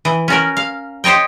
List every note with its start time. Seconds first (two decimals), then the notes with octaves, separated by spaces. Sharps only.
0.05 E3
0.28 C#4 F#4 A#4
0.57 F5
1.04 G4 C5 C#5 D#5 G5